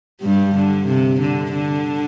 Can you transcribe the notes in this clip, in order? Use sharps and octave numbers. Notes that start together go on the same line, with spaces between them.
G2 G3
D3
C3
D3
D3